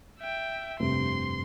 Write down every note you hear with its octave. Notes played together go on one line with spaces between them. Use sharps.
E5 G5
F1 G2 C3 C6